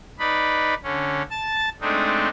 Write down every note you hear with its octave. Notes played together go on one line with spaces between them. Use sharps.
D#4 B4 D5 B5
D3 C#4
A5 A6
G#3 A3 C4 D4 D#4